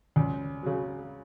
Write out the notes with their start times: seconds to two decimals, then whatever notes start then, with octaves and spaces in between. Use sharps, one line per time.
0.16 C#2
0.63 C#3 F#3